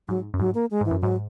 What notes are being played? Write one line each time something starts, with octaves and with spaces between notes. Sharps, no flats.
G#2 F#3
F#2
G#2 F#3
A#3
G#3
G#2 E3
F#2
G#2 F#3